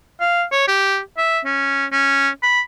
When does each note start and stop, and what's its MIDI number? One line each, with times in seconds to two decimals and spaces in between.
0.20 0.43 77
0.52 0.65 73
0.68 1.00 67
1.17 1.39 76
1.45 1.85 61
1.92 2.29 61
2.43 2.60 83